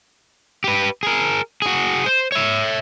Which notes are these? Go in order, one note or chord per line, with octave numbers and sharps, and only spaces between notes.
G4 B4
G#4 A#4
F#4 G#4
C5
C#5 E5